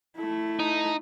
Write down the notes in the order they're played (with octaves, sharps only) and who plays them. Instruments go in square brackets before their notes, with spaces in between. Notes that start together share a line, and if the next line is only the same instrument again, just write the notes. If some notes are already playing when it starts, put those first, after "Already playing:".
[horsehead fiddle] A3 E4
[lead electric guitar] D#4